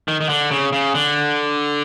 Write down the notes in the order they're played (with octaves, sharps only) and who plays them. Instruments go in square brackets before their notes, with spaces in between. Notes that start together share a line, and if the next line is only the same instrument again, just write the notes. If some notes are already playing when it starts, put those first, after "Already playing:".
[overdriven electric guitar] D#3
D#3
D3
C#3
C#3
D3